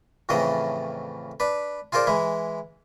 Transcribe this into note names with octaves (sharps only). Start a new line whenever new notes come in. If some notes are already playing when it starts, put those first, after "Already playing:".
F2 A2 C#3 E3 A4 D#5
D4 B4
F4 G#4 A#4 C5 D5
E3 G#3 E4